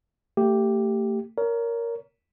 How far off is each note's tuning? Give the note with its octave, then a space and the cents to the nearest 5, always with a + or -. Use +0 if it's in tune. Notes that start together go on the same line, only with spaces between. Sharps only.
A3 +35 G4 +0
A#4 +0 C#5 +35